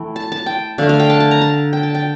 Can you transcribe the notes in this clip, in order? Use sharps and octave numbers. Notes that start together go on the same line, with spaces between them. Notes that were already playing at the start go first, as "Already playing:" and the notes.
Already playing: E3 A3 G5
A5
A5
G5
D3 A3 F5
F5
G5
A5
A5
A#5
A5
G5
A5
G5